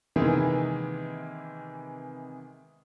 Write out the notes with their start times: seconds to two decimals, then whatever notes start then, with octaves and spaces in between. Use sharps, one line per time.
0.16 C3 D#3 E3 G#3 A#3 B3